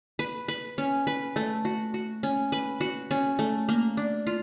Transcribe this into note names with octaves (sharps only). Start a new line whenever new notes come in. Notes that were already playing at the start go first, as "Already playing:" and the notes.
B4
B4
C#4
B4
A3
F#4
F#4
C#4
B4
F#4
C#4
A3
A#3
D4
F4